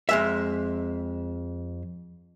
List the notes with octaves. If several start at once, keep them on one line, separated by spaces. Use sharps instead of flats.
F2 G#3 E5